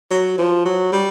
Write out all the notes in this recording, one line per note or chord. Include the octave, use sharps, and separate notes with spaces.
F#3
F3
F#3
G3